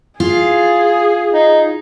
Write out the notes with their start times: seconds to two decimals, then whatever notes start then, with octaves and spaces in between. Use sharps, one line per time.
0.20 F4 G#4
1.33 D#4